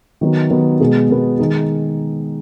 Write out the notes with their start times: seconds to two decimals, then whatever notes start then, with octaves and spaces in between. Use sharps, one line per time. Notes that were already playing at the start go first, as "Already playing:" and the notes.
0.21 D#3 F#3 B3
0.50 D#3 F#3 B3
0.80 B2 G#3 B3
1.10 B2 G#3 B3
1.39 D#3 G#3 D#4 G#4